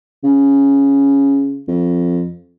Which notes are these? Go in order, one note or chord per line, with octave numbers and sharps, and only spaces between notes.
C#3
F2